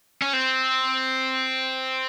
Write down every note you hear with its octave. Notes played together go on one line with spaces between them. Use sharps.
C#4
C4